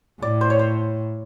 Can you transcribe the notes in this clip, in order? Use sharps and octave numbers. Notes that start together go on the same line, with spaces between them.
A2 D5
C5
C#5
C5